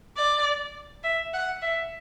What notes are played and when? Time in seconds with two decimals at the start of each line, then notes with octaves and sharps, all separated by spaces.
0.17 D5
1.04 E5
1.34 F#5
1.62 E5